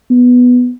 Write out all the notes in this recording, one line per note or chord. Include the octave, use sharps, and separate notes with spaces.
B3